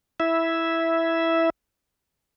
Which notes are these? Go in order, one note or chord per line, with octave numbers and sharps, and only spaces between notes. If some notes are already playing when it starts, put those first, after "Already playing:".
E4 E5